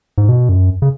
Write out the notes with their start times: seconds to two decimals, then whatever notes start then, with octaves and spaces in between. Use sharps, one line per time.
0.18 G#2
0.29 B2
0.49 F#2
0.82 C#3